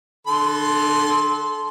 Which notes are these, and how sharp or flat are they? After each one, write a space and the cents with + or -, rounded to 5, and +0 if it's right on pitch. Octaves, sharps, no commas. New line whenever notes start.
D3 +25 A4 -30 C6 +0